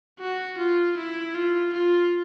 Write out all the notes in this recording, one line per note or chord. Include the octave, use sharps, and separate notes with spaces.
F#4
F4
E4
F4
F4